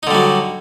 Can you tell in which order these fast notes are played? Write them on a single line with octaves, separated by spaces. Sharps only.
D#4 D3 G3 F#3